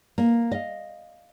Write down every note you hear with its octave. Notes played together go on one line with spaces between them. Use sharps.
A#3
D#5 F5